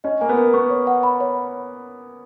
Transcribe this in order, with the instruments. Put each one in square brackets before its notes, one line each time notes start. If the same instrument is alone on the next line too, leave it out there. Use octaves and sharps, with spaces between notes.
[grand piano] C#4 [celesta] D#5
[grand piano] A#3 [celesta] G#5
[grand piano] B3
[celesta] A#4
[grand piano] B3 [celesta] C#6
[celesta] C#5
F#5
B5
C#5